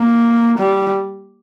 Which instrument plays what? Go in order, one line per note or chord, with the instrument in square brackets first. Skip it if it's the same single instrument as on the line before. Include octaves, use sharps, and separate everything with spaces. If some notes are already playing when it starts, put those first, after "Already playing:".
Already playing: [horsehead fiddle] A#3
G3